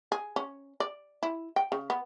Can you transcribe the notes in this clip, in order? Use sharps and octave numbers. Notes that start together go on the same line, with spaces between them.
G#4
C#4
D5
E4
G5
C#3
B3